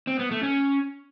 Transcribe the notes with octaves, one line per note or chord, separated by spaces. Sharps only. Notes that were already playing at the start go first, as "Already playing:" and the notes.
C4
B3
A3
C#4